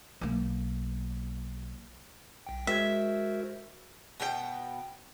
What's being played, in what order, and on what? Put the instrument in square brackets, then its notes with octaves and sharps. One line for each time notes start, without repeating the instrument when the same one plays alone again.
[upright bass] B1 A#3
[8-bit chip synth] B1 G5
[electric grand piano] G#3 G#6 [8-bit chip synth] F#4 A#4 C5 [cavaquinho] E5
[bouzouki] B2 B3 E4 G5